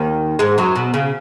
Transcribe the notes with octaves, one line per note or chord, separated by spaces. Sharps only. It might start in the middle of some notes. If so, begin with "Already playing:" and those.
Already playing: D#2 D#3
G#2 G#3
F#2 F#3
B2
C#3